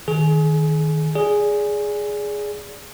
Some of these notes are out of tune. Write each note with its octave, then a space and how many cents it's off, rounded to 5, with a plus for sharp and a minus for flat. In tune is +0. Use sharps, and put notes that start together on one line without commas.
D#3 +0 G#4 +30
G#4 +0 D5 -20